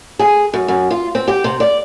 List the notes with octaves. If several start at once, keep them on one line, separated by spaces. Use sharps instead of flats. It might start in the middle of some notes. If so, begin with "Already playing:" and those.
G#4
F#2
F#2
F4
C4
G4
C3
D5